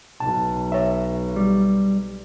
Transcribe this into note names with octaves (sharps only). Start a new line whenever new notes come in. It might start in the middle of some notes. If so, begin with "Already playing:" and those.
B1 A5
C#5 E5
G3